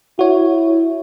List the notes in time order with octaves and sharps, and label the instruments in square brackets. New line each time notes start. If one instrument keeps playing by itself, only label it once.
[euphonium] E4 [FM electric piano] F#4 C#5